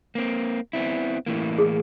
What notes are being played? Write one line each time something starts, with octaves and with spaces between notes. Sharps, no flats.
A#3 C4
B3 C4 E4
A2 E3 A#3
G#4